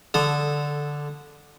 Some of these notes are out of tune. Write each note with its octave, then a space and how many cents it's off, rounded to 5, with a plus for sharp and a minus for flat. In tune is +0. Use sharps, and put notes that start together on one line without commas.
D3 +0 A4 -10 D#6 -15